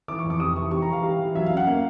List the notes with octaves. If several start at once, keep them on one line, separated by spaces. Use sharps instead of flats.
E3 D6
C#6
F2
D6
C3 D#6
E3 C#6
G3 C#6
A#5
E3
F5
G3
E3
F#3 E5
C#4 F5
F#5
A#3 F5